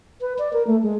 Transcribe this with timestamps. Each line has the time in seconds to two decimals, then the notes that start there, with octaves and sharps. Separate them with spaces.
0.21 B4
0.39 D5
0.53 A#4
0.67 A3
0.83 G#3